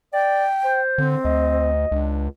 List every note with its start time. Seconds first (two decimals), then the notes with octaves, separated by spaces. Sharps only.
0.13 D5 G5
0.65 C5
0.98 D3 C4
1.25 D2 D#5
1.92 C#2 D4